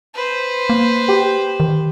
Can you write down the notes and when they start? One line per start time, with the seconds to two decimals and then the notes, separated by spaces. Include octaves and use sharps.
0.15 B4 C5
0.70 A#3
1.08 G4
1.60 D#3